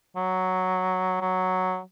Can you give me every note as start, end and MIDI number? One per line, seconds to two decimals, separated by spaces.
0.16 1.21 54
1.21 1.81 54